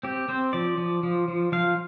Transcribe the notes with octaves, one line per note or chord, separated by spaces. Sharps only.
C4 G4
C4 C5
F3 D5
F3
F3
F3
F3 F5